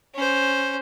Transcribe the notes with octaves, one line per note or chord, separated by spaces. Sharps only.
C#4 C5